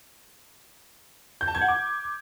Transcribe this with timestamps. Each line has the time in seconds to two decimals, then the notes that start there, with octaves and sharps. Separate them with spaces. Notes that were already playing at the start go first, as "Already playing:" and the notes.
1.41 G6
1.48 A5
1.55 G#6
1.61 F#5
1.68 D6